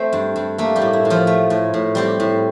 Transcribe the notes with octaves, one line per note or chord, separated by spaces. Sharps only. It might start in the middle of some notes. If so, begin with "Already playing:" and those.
Already playing: A3 C4 C5
G2
G2
A3 A#3 A4
G3 G4
A2
E4
A2
F3 F4
A3
A2
A2
G3 C4 G4
A2